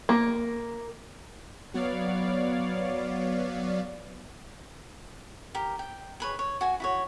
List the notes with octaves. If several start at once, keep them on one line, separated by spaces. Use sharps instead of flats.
A#3
F#3 B3 C#5 D5 F5
G4 A#4
G5
G#4 B4 C#5
C#5
F#4 G#5
E4 F#4 C#5